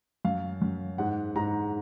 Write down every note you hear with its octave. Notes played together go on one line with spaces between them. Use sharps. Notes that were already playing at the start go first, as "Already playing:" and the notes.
F#2 F5
F#2
G#2 F#5
G#2 A#5